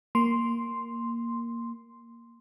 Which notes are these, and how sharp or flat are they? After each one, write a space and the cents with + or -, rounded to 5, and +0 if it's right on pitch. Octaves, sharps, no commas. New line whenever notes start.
A#3 +0 C6 +0